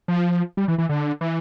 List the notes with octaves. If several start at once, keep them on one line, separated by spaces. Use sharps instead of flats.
F3
G3
E3
E3
D3
E3